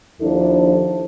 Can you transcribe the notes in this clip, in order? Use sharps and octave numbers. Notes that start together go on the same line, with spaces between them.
D#2 F3 D4 E4 A4